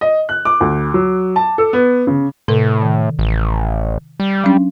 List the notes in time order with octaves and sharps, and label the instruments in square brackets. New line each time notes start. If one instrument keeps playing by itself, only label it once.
[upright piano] D#5
F#6
D6
D2
F#3
A5
A4
B3
C#3
[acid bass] A2 [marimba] C3 A4
[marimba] D#3
[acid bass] A1
G3
[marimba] F#3 C#4 D4